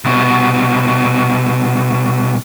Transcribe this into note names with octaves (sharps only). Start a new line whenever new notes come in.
C2 B2